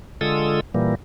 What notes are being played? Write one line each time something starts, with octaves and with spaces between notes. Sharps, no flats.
D3 G#3 F4 A4 D#6 E6
A#2 E3 G3 A#3